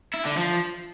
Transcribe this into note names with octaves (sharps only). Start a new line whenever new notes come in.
E4
D3
F3